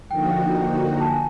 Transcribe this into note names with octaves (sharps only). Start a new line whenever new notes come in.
D3 F3 A#3 D#4 F#4 G5
A5
G#5